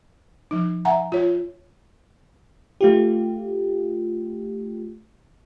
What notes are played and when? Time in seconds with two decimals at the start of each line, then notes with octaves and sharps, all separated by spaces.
0.51 F3 D#4
0.85 E5 F#5 G#5 A#5
1.12 F4 C#5
2.81 A3 F4 G4